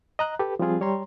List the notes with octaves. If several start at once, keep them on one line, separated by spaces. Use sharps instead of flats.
D#5 A#5 F#6
G4 A4 B4
F3 G3 C4 F4 G#4
G3 C#5 A#5 C6